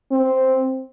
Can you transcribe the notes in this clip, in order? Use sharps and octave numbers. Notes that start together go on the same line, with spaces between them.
C4